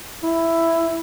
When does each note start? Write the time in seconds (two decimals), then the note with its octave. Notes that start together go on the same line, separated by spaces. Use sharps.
0.23 E4